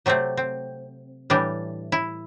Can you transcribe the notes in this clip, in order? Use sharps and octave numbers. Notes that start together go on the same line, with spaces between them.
C3 F#3 A3 C4
C4
A2 E3 G3 D4
E4